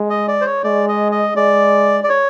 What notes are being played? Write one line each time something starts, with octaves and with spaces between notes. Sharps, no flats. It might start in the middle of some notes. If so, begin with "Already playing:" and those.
Already playing: G#3
D#5
D5
C5
C#5
G#3 D5
D#5
D#5
G#3 D5
D5
C#5